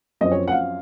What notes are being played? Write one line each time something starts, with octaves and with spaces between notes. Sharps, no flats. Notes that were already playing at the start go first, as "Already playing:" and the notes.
F#2 F3 C4 D#5
C#5
F#5
F5